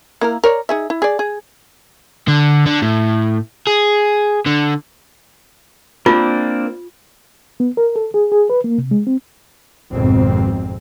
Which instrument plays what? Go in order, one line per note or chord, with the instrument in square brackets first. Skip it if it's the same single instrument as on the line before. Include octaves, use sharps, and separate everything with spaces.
[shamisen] A#3 E4 A#4
A#4 C#5 D5
D#4 G#4 E5
E4
G#4 D5
G#4
[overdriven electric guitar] D3
D3
A2
G#4
D3
[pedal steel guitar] A#3 C4 D4 [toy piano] F4
[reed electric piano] B3
A#4
A4
G#4
G#4
B4
A#3
C3
G#3
C4
[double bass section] G#1 F2 B2 C4